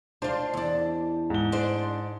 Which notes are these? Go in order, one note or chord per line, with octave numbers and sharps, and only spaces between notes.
D4 F4 C5
E2 D4
G#2 G7
D4 C5